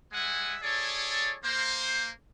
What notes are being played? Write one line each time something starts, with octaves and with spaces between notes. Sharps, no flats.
G3 G#3 E5 F#5 G#5
E4 G#4 A4 C#5 D5 A5
A#3 C5